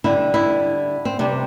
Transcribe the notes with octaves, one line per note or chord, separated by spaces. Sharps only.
D3 G3 E4
E4
C4
C3 G3 D4